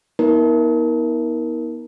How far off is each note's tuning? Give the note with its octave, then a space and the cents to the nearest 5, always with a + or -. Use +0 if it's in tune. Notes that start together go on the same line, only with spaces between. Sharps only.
B3 -25 D#4 +45 A#4 +10